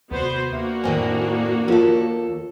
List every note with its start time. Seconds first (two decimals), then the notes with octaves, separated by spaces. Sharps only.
0.11 D#2 C3 B3 F#4 C5
0.53 A#3 D4 F#4 E5
0.84 F2 A2 D#3 G#5
1.68 D#2 F3 F4 A4 A#4